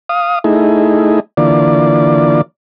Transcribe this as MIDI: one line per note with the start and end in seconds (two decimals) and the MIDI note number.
0.09 0.39 77
0.09 0.39 87
0.44 1.20 57
0.44 1.20 63
0.44 1.20 64
0.44 1.20 68
1.37 2.41 50
1.37 2.41 52
1.37 2.41 58
1.37 2.41 65
1.37 2.41 74